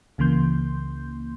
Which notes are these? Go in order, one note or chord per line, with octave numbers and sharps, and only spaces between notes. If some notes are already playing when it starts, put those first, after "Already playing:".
C#2 C#3 E3 A#3 C6 G6